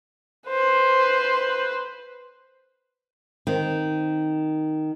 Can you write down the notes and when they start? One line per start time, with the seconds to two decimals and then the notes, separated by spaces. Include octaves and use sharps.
0.49 B4 C5
3.47 D#3 C4